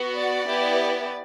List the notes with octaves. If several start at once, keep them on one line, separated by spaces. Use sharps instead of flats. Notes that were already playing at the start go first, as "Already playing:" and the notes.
Already playing: B3 F#4
D5
B3 E4 G4